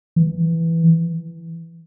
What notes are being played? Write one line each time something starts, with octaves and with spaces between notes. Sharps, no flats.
E3